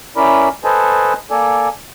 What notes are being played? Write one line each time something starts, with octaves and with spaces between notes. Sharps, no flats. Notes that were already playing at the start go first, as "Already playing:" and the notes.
C#4 E4 A#4 D5 B5
A4 B4 C5 D#5 G#5 A5
A#3 A4 D5 G#5